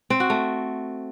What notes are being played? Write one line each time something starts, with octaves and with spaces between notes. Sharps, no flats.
C4
F#4
A3